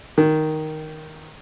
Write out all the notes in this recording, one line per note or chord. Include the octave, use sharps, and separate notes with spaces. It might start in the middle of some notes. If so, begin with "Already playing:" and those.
D#3